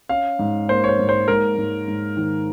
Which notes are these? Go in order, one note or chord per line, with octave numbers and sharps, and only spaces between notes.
C#4 F5
G#2
A#3 C5
C#5
C5
G#2
C5
G#2 A#4
G#2
G#2
D#3